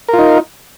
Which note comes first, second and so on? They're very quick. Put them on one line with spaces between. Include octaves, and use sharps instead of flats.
A#4 F4 D#4